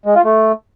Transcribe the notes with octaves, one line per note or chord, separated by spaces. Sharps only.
G#3
F4
A3